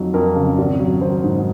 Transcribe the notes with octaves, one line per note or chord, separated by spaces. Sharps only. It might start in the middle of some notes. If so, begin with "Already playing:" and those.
Already playing: F2 F#3 D#4
F2 A#4
C#3
G#1
F#3
G#1 C5
G#2